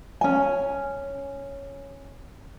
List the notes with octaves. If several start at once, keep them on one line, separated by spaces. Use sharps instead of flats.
C#4 G#5